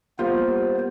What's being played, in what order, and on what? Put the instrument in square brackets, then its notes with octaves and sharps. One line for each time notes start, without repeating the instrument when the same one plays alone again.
[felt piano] G3 A#3 F4 [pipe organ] B3 C5